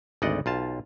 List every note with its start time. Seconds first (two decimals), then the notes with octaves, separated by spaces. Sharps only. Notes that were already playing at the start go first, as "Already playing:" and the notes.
0.22 G#1 D2 D5 D#5 F#5
0.46 B1 F4 A5